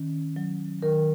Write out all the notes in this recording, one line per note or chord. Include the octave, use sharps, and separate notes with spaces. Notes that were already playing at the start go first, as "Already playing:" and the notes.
Already playing: D#3 C#4
F#3
D#3 A#4